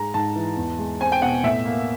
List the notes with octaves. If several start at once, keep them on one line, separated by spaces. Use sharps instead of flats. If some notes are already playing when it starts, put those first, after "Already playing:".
Already playing: G#2 G#3 A#5
G#2 A5
E3
E2
G#3
C4 G#5
G5
B2 F#5
A2 E5
A#3